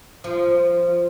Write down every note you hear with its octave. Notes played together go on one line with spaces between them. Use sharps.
F3